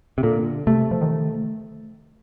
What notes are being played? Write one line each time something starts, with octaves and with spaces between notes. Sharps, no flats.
C3
A#2 D3
C3 A3
F3
D#3